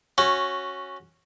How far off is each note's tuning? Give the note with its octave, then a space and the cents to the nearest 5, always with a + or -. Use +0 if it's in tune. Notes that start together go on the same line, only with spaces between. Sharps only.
C#4 -10 F#4 +0